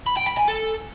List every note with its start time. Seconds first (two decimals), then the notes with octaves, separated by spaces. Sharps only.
0.07 B5
0.17 G5
0.27 B5
0.38 G#5
0.48 A4